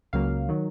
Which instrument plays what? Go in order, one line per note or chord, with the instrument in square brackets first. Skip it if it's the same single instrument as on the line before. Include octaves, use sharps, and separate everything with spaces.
[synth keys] C#2 C#3 F#3 A#3 F5
D#3 F#3